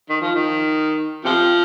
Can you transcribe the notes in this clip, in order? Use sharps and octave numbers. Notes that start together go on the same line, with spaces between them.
D#3
F3
D#3
C3 F3